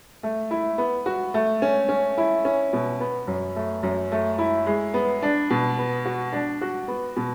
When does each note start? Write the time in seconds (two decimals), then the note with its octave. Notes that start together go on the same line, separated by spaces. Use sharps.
0.23 A3
0.51 E4
0.78 B3
1.06 F#4
1.34 A3
1.62 C#4
1.89 C#4
2.18 E4
2.45 C#4
2.73 B2
3.00 B3
3.27 F#2
3.56 A3
3.83 F#2
4.12 A3
4.38 E4
4.66 G#3
4.94 B3
5.22 D4
5.50 B2
5.78 B3
6.05 F#4
6.33 D4
6.61 F#4
6.88 B3
7.16 B2